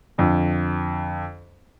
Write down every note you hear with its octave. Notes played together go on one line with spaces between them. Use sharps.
F2 D3